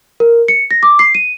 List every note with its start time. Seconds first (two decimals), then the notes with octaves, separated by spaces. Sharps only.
0.20 A#4
0.48 C#7
0.71 A#6
0.83 D6
0.99 C7
1.15 D#7